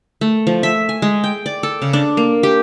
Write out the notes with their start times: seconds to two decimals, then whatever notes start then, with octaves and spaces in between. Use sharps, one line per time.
0.21 A3
0.47 F3
0.63 E5
0.89 G#5
1.02 G#3
1.24 G5
1.46 D5
1.63 A4
1.82 C#3
1.93 D4
2.17 A#3
2.43 G4